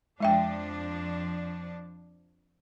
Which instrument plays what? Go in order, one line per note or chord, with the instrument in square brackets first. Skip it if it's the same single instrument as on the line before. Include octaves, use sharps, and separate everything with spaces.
[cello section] F2 F3 D4 [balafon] G#3 E5 G5